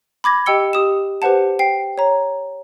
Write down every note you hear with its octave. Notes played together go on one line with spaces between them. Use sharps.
B5 D6 G#6 A#6
G4 D#5 G5 E6 C#7 G7
G4 D#6 E7
G4 B4 C5 F#5 A5
G5 C7
C#5 A#5